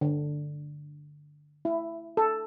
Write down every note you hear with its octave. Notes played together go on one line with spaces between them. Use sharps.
D3
E4
A4